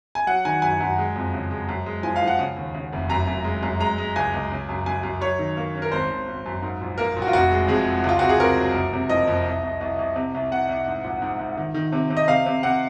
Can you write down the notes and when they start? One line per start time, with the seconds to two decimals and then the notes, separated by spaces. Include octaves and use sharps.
0.15 G#5
0.27 F#3 F#5
0.45 D#3 G#5
0.62 F#2 G#5
0.81 F#2
0.98 G#3
1.16 F2
1.34 C#3
1.51 G#3
1.69 F#2
1.86 G#3
2.03 F3 G#5
2.16 F5
2.22 F3
2.27 F#5
2.39 C#3
2.56 D#2
2.74 C#3
2.92 F1
3.10 F#2 A#5
3.27 F#2
3.44 G#3
3.63 F#2
3.80 G#3 A#5
3.98 G#3
4.16 C#2 G#5
4.33 C#2
4.51 C#3
4.69 F#2
4.86 F#2 G#5
5.03 F#2
5.21 F#2 C#5
5.39 D#3
5.57 A#3
5.75 C#4
5.82 A#4
5.92 G#1 C5
6.10 G#1
6.27 G#1
6.46 F#2
6.62 G#2
6.81 A#1
6.98 A#3 A#4
7.16 A#1
7.22 F#4
7.28 F4
7.33 F1 F#4
7.51 G#3
7.68 F2 G#4
7.87 G#3
8.04 C#2 F4
8.19 C3 F#4
8.29 G#4
8.39 C4 A#4
8.57 F#3
8.74 F#1
8.93 C3
9.09 F3 D#5
9.27 F2
9.46 C2
9.63 C2
9.81 C2
9.98 C2
10.16 C3
10.34 C2
10.51 C2 F#5
10.69 C2
10.87 G#2
11.04 A#1
11.22 G#2
11.39 G#2
11.57 D#3
11.74 D#3
11.92 C3
12.10 C3
12.17 D#5
12.28 C3 F5
12.46 C3
12.63 C3 F#5